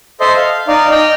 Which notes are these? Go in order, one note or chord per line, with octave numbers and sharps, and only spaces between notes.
A4 C5 D#5 E5 C6
F5
D#4 D5 F5
D#5 G5 F6